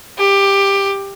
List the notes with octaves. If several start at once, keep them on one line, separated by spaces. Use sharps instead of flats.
G4